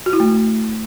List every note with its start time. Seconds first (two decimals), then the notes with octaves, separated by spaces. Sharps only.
0.06 F#4
0.13 E4
0.20 A3